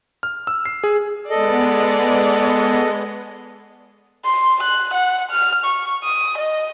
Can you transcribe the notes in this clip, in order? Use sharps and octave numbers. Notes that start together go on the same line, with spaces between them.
F6
E6
C7
G#4
G#3 B3 A4 D5 D#5
C6
F#6
F#5
F6
C#6
D#6
D#5